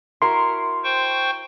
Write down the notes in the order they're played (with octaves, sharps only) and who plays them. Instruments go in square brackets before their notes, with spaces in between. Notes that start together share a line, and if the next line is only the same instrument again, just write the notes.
[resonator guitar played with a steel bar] E4 F#4 A#4 [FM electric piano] C6
[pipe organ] C5 G5 C#6